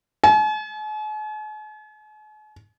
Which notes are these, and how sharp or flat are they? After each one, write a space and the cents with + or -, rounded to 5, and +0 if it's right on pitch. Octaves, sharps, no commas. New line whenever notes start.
G#5 +45